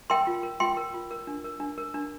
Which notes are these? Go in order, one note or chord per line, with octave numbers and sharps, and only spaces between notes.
A#4 G5 C6
F4
A#4
F4 G5 C6
A#4
F4
A#4
D4
A#4
D4
A#4
D4